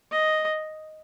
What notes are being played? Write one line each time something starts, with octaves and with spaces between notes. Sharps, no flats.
D#5